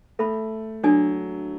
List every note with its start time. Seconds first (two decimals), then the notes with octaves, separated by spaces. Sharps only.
0.19 A3 A4 E5 B5
0.83 F#3 D4 A4 D5 G#5